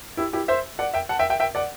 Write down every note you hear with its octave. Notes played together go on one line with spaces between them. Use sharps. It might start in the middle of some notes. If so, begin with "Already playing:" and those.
E4 G4
E4 G4
C5 E5
D5 F#5
E5 G5
F#5 A5
E5 G5
E5 G5
E5 G5
D5 F#5